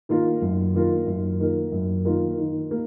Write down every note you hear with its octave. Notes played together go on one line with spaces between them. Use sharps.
D#3 A#3 F4 A#4
F#2
D#3 A#3 F4 A#4
F#2
D#3 A#3 F4 A#4
F#2
D#3 A#3 F4 A#4
D#3
A#3